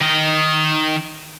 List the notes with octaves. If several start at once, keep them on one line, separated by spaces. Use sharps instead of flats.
D#3 D#5